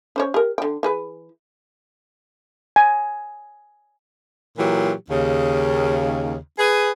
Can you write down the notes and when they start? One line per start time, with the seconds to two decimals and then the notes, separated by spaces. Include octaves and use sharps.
0.16 C#4 C5 C#5
0.34 G4 A#4
0.58 D3 G5
0.83 E3 G#4 B4
2.76 G#5
4.58 A#2 E3 F#3 G4
5.10 D#2 C#3
6.59 G#4 B4